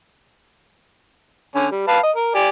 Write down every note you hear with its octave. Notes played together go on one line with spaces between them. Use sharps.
D3 C#4
G3
B4 F5 A5
D#5
A#4
G4 D5 G#5